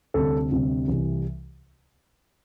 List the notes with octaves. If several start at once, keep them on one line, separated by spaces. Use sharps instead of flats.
D2 C3 G3 C4 A4
D2 C3 G3 C4
C2 C3 E3 G3